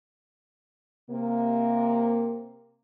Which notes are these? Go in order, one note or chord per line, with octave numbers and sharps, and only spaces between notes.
C3 A#3